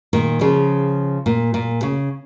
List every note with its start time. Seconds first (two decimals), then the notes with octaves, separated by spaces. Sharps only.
0.13 A#2 D#3
0.41 C#3 F3
1.26 A#2
1.54 A#2
1.83 C#3